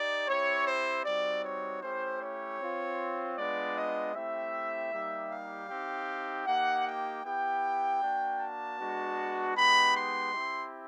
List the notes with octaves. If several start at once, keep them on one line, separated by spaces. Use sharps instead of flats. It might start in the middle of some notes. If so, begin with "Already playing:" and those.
Already playing: D#4 G4 D5
C4 E4 G4 C#5
C5
G3 C4 D#4 F#4 D5
C#5
A3 C#4 E4 G4 C5
C#5
C4 F4
G#3 B3 D4 F4 D5
D#5
A3 C4 E4 G4 E5
G3 A#3 D#4 G4
F5
C4 D#4 G4
A#3 D#4 G4 F#5
G5
B3 E4 G4 G5
A#3 D4 F#4
A5
G#3 B3 D4 F#4
G#3 B3 D#4 G4 B5
C6
C4 E4 G4